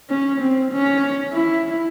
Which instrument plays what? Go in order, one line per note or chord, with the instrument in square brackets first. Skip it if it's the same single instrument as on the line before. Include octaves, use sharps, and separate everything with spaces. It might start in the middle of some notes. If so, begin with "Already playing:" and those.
[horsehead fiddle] C#4
C4
C#4
E4